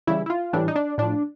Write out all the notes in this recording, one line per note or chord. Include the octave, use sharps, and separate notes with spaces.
C#3 E3 G3 E4
E4
F4
A2 E3 G3 D4
D#4
D4
A2 F3 D4